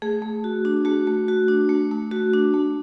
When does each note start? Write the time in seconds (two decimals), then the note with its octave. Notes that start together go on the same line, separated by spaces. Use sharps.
0.02 A3 G#4
0.22 A3
0.44 F#4
0.65 D4
0.85 A3 F#4
1.07 A3
1.28 F#4
1.48 D4
1.69 A3
1.91 A3
2.11 F#4
2.33 D4
2.54 A3